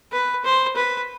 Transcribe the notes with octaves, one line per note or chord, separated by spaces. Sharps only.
B4
C5
B4